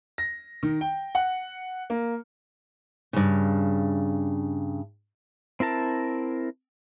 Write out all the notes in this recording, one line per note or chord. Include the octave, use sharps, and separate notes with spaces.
A#6
D#3
G5
F#5
A#3
G2 C#3
C4 E4 A#4 A5